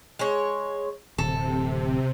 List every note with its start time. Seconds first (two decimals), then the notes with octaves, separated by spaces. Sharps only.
0.19 G#3 C#5
1.18 D1 C3 A4